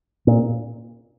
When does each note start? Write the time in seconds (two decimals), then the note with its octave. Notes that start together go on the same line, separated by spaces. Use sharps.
0.27 A#2